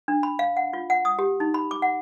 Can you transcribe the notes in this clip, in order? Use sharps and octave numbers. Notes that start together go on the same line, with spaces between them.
D4
B5
F5
F#5
F4
F#5
D#6
G4
D#4
B5
D6
F#5